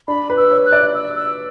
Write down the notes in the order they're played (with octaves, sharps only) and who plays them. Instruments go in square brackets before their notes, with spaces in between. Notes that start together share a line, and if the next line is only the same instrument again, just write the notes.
[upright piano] D4 [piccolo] B5
[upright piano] B4
[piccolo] E6
[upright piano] C#5
[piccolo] F#6
[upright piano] D5
[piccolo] E6
E6